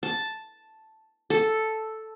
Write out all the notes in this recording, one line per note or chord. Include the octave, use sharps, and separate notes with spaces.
A5
A4